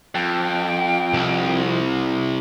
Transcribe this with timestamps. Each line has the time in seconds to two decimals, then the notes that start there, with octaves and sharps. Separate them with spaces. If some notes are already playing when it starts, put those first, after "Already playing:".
0.15 F2 G5
1.14 C2